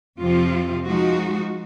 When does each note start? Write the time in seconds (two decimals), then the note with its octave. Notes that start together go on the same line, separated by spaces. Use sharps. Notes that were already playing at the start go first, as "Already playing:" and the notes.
0.20 F2 C3 F3 C4 F4
0.86 F3 G#3 D#4 F#4